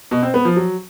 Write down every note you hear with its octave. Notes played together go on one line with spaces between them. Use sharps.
B2
C4
B3
F3
F#3